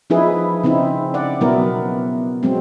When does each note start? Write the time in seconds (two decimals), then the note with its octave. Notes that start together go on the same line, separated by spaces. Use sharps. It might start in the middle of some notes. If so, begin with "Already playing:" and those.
0.10 F3 D#4 E4 G#4 B4
0.63 C#3 C4 D#4 E4
1.14 D5 F#5
1.41 B2 F#3 B3 E4 A#4
2.43 F#3 G#3 C4